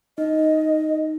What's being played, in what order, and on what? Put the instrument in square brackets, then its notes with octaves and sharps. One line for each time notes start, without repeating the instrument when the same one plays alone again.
[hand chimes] D#4 [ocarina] D#5